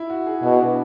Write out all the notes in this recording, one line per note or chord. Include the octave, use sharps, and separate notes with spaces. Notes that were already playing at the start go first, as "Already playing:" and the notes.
Already playing: E4
F#4
G#4
B2 F#4
D4